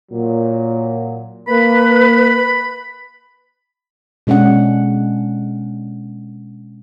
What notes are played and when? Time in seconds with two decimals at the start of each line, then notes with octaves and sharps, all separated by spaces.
0.11 A#2 F#3
1.48 A#3 B4 B5
4.27 B2 G#3 C#4 D4 F#5